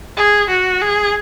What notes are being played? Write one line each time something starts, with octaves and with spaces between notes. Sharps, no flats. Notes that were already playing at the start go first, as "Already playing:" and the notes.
G#4
F#4
G#4